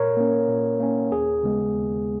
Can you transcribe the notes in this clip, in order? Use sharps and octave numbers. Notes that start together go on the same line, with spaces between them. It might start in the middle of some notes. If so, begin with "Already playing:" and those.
Already playing: A#2 A#4 C#5
A#3 C#4
A#2
A#3 C#4
D#2 G#4
C#3 G#3 B3
D#2